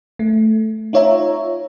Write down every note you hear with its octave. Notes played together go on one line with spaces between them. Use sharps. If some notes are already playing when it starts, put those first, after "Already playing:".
A3
D#4 F4 C#5 E5 A#5